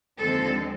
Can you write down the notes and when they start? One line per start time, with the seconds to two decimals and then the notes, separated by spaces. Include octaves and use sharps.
0.19 D#2 D3 F3 G#3 C4 A4